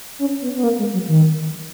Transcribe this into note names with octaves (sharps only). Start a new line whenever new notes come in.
C#4
B3
B3
A#3
G#3
F#3
D#3